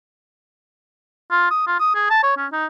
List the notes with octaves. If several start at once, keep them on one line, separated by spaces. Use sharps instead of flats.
F4
D#6
F4
D#6
G#4
A5
C#5
C#4
D#4